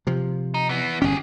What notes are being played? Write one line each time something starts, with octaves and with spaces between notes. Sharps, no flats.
C3 F3
D#4
E3 B3
G1 C#4 G4 G#4